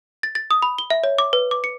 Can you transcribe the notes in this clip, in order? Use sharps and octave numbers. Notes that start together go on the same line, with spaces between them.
A6
A6
D#6
B5
G7
E5
C#5
D6
B4
D6
C#7